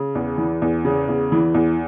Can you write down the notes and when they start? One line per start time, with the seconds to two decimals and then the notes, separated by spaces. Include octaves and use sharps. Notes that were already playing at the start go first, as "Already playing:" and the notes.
Already playing: C#3
0.15 E2
0.38 E3
0.62 E2
0.85 C#3
1.09 E2
1.32 E3
1.54 E2